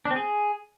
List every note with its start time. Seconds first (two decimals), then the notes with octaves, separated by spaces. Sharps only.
0.05 D4
0.11 C4
0.16 G#4